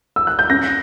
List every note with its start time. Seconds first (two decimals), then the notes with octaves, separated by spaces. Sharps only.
0.16 E6
0.27 F#6
0.39 G6
0.50 C#4 A#6